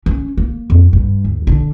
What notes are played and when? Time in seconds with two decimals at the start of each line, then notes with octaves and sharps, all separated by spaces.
0.06 C#4
0.38 A#3
0.70 F2
0.93 G2
1.24 D2
1.47 D3